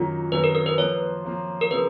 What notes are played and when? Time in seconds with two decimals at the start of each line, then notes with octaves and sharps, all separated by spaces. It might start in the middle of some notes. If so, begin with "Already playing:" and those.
Already playing: F#2 D#3 F#3 A#3 F4
0.32 F#2 D#3 F#3 A#3 B4
0.44 A#4
0.55 A#4
0.66 B4
0.77 F3 A#3 F4 C#5
1.25 F3 A#3 F4
1.61 A#4
1.71 C#3 F3 A#3 F4 B4